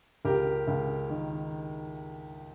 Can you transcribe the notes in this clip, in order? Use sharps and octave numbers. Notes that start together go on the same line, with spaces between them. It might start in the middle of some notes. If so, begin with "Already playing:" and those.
C#2 G4 A#4
C#2
D#3